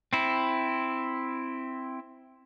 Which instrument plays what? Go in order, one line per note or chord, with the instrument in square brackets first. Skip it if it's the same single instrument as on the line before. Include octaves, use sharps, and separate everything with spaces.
[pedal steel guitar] C4 E4